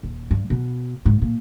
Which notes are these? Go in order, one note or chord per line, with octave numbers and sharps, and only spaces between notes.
D#1
G2
B2
G#2
A#2